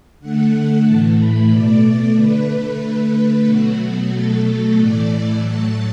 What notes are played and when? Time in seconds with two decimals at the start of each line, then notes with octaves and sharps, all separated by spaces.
0.20 D3 A3 F#5
0.85 A2 E3 A3 A5
1.17 B5
1.50 B2 A3 D5
2.15 D3 A3 B4
2.80 D3 A3 B4
3.45 B2 F#3 A3 F#4
4.09 B2 F#3 A3 A4
4.74 A2 E3 A3 D5
5.40 A2 F#3 A3 A5